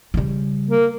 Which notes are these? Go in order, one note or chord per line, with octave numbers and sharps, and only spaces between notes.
C#3 G3
A#3